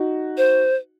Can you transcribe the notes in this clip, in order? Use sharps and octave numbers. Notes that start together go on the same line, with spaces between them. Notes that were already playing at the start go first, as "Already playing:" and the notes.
Already playing: D#4 F#4
C5